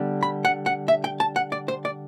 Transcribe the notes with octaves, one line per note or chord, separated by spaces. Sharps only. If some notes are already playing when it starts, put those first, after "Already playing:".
Already playing: D3 G3 B3
B5
F#5
F#5
E5
G5
A5
F#5
D5
C5
D5